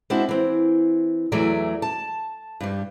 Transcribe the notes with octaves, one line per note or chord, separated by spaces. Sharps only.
G#3 C4 D4 E4 F#4
E3 C4
E2 E3 F#3 A3 G#4 D5
A5
G2 G3